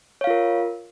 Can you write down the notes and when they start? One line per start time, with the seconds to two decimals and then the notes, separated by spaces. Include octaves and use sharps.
0.21 C#5
0.24 F5
0.27 F4
0.30 A#4